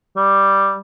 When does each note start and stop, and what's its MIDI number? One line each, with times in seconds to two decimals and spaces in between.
0.17 0.78 55